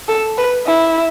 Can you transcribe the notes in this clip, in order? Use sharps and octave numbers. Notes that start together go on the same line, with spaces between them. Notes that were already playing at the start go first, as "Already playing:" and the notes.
A4
B4
E4